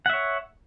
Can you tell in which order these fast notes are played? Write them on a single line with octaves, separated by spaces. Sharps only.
F#5 E5 C#5